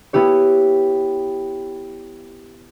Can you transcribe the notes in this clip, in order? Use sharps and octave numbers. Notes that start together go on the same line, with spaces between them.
B3 E4 G4 C#5